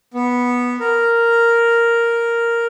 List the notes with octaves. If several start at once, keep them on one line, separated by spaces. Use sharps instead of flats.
B3
A#4